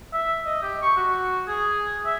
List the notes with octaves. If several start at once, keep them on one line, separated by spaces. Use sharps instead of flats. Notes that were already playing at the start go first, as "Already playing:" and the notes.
E5
D#5
G4
C#6
F#4
G#4
E5